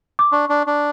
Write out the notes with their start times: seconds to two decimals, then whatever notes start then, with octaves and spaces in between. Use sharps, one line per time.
0.19 D6
0.32 D4 C#6
0.49 D4
0.67 D4